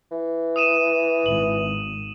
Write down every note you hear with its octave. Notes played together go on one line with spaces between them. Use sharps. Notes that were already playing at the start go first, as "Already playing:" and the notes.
E3
D#6 D#7 E7
G#1 F#7